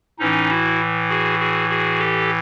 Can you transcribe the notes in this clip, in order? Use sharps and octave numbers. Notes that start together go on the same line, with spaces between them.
A2 E3 C#4 D#4
E4 F#4
F#4 G#4
F#4 G#4
F#4 G#4
G4 A4